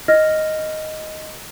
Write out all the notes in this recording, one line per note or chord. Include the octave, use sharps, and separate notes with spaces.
D#5 F6 A#6